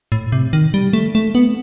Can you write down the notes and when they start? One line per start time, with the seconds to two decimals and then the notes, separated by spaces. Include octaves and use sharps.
0.12 A2
0.32 C3
0.53 D#3
0.74 G3
0.93 A3
1.15 A3
1.35 B3